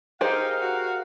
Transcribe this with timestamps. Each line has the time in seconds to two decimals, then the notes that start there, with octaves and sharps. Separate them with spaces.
0.21 D#4 G4 G#4 A#4 C5 F5
0.60 F#4